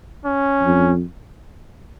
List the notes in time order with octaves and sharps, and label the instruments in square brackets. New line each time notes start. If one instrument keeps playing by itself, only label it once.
[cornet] C#4
[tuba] F2